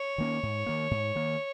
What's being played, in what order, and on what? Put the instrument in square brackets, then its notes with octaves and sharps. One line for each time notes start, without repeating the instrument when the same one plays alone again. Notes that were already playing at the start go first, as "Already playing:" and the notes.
Already playing: [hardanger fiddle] C#5
[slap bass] D#3 A#3 C#4
G#2
D#3 A#3
G#2
D#3 A#3